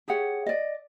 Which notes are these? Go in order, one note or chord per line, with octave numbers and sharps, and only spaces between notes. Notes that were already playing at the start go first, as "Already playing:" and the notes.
G4 G#4 C#5 F#5
D5 D#5